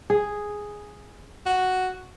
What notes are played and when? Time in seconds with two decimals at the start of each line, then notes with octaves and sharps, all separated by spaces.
0.10 G#4
1.46 F#4